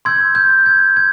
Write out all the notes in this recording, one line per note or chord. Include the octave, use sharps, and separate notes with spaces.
C6 E6 G6 G#6
G6
G#6
G#6